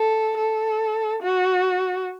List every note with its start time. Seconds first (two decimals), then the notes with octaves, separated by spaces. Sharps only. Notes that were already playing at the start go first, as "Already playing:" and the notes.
Already playing: A4
0.37 A4
1.23 F#4